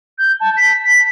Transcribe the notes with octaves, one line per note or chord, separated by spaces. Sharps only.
G6
A5
B6